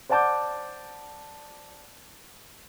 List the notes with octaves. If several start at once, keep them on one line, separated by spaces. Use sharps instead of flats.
C5 D5 F#5 A5 D6 G6